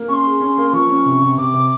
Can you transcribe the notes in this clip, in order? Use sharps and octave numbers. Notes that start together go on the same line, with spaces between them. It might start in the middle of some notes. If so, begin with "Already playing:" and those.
Already playing: A#3
C#4 C#6
C6
G#4
C#4
A#3
F3 C#6
C#4
C3
C3
C3 D6
C3